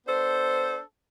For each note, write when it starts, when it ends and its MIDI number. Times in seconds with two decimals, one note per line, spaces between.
0.06 0.79 59
0.06 0.79 62
0.06 0.79 69
0.06 0.79 72